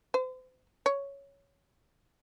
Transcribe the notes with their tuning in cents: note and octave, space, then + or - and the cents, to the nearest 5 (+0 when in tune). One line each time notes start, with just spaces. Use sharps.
C5 -40
C#5 +5